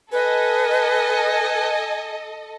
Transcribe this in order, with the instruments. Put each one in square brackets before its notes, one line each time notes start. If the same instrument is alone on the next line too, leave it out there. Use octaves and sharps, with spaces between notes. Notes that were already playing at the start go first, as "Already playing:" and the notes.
[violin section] A4 D#5 [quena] B4 [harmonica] G#5